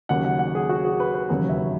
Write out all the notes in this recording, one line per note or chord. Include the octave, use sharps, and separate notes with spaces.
D#2 C#3 F#3 F#5
F#5
F#5
G#4
F#4
G#4
B4
B4
E1 D#2 C#3 F#3 B4
E5